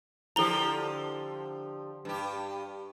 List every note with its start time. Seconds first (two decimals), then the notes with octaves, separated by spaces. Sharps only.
0.36 D3 F3 E4 G4 A4 A#5 G7
2.05 G2 G4